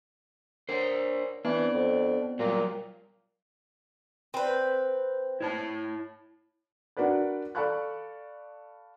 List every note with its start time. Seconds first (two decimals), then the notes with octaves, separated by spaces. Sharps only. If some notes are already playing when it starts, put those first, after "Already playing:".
0.69 D4 A#4 C5 C#5
1.45 E3 B3 C4 D4
1.74 F2
2.39 A#2 F#3 G3 F4
4.34 C4 B4
5.40 E4 C#5 A5
6.97 D4 F#4 A#4 B4 D5
7.55 A4 D5 F5 B5 C#6 F#6